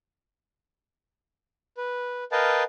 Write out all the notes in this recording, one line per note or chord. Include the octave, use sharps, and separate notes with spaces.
B4
A#4 B4 D#5 F5 G5 A5